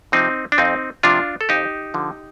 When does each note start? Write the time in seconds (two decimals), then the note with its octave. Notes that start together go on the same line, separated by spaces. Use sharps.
0.12 C3 F3 C4 D#4
0.52 D4
0.58 F2 C4 D#4
1.03 C3 F3 D4 F4
1.41 A4
1.49 F2 D#4 G4
1.94 D3 F3